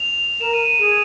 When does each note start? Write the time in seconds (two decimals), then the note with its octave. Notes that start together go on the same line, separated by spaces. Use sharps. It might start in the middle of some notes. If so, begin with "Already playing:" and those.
Already playing: F7
0.40 A#4 E7
0.53 D#7
0.65 D#7
0.79 G#4 D#7